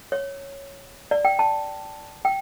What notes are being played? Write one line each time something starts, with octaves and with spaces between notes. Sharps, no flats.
C#5
D5
G5
A5
G5